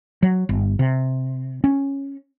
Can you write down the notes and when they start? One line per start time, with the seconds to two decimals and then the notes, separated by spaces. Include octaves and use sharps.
0.23 F#3
0.49 G1
0.79 C3
1.64 C#4